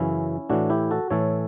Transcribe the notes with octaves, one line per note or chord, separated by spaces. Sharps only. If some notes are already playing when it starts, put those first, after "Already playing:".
Already playing: F#2 C#3 E3 C#4 E4
A2 E3 D4 F#4
E4 G4
F#4 A4
A2 E3 A4 C#5